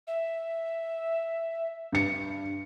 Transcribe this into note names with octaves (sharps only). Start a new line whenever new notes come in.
E5
G2 C#7